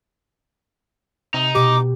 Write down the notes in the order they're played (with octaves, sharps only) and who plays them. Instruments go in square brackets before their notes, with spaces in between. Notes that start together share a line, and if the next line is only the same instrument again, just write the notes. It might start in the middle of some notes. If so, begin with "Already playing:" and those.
[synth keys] C3 [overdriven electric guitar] D#4
[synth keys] B2 G4 [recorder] D6